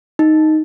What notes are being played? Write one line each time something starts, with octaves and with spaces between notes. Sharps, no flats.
D#4